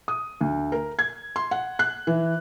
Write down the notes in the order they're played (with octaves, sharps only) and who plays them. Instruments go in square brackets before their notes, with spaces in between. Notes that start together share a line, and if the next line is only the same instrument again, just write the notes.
[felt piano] D#6
D2
A#4
G#6
C6
F#5
F#6
E3